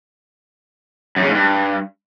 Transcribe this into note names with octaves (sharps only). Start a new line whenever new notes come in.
F#2
C#3
G#2
G2